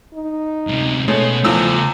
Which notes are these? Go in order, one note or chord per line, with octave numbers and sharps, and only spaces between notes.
D#4
D2 C3
B2 G#3 A3 C#4
E2 C#3 F3 A3 E6